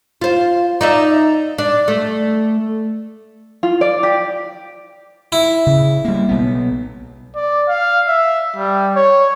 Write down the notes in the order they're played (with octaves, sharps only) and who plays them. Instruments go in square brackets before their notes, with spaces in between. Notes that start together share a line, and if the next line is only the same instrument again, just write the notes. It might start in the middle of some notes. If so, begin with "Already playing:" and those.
[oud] F4 C5
D#4 D5 E5
D4
A3
[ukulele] F4
D5
G4
[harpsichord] E4
[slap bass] C#3
G3 A#3
B1 B3
[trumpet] D5
F5
E5
G3
C#5